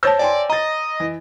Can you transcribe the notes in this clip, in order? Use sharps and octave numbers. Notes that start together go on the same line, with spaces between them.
C5 C#5 A5 E6 G6 A#6
D5 G5 G#5 C6
D#5 A#5 A6
E3